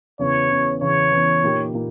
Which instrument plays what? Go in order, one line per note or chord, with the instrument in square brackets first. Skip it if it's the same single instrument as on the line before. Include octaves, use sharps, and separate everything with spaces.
[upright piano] E2 C#3 E3 [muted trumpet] C#5
[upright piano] E2 C#3 E3
[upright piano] E2 C#3 E3 [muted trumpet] C#5
[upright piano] E2 C#3 E3
A#2 A#3 D#4 G4
A#2 A#3